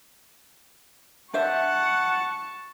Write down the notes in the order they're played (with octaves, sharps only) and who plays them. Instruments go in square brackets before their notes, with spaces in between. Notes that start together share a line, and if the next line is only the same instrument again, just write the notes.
[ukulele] D4 C5 E5 [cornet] F#5 [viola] A5 C#6